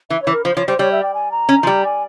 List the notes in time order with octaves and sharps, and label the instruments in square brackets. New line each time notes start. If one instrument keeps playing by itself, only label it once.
[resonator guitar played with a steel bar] E3 [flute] E5
[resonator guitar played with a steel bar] E3 [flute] C#5
[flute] A#4
[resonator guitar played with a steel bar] F3 [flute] C5
[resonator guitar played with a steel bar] F3 [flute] C#5
[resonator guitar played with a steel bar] G3 [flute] C5
[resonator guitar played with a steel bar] G3 [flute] C#5
[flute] E5
G5
G#5
A#5
[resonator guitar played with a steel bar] C#4
F3
G3
[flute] G#5